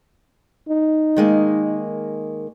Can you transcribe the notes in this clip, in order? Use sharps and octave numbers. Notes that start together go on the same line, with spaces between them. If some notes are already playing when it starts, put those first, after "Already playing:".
D#4
D#3 G#3 A#3